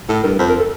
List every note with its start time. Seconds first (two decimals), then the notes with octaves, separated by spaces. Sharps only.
0.09 A2 A4
0.23 G2 A#4
0.39 F2 C5
0.49 A#4
0.59 A4